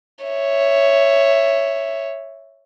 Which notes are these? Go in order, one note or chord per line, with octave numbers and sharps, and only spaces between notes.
C#5 E5